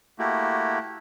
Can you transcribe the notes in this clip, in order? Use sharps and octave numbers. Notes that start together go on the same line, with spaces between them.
A3 A#3 E4 F#4 G4